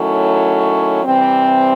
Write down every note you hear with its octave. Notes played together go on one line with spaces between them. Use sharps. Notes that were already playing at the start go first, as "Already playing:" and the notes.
Already playing: D#3 F#3 A3 C#4 E4
C3 E3 G3 C4